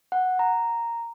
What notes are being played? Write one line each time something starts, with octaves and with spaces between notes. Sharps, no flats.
F#5
A#5